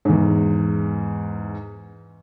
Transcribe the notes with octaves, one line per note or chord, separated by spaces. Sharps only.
E2 G#2